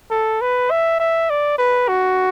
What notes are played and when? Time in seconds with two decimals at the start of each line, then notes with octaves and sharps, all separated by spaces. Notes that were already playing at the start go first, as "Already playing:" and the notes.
0.10 A4
0.41 B4
0.71 E5
1.00 E5
1.30 D5
1.58 B4
1.88 F#4